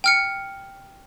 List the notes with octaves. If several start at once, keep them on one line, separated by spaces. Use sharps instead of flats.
G5 F6 C#7